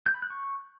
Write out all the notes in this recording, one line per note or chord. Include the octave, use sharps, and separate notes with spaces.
G6
B5
F#6
C#6